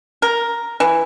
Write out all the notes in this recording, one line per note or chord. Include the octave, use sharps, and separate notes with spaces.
A#4
E3